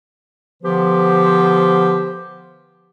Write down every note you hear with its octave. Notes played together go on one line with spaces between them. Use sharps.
D3 F3 B3 G4 B4 C5